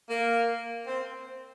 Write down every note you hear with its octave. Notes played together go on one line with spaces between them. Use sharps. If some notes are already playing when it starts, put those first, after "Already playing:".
A#3
C4